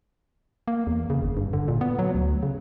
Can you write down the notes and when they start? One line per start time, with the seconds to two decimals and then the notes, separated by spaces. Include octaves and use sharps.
0.68 A#3
0.87 E2
1.10 C#3
1.23 G1
1.37 G2
1.53 D3
1.68 A#2
1.81 B3
1.99 F#3
2.15 D2
2.43 C#3